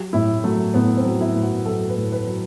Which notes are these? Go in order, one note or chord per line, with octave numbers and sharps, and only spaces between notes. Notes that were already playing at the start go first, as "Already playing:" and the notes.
Already playing: F#3 G4
A2 E4
F#3 A3
A2 B3
C4
F#3
E4
A2
F#4
F#3 A4
B4
A2
B4
F#3